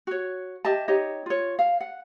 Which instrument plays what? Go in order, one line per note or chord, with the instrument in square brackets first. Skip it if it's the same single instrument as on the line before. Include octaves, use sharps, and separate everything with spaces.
[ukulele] F#4 C#5
G4 D#5 E5 A5
D#4 G4 C#5 D#5
F4 C#5
F5
F#5